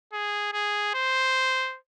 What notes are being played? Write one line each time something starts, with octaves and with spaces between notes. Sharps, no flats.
G#4
G#4
C5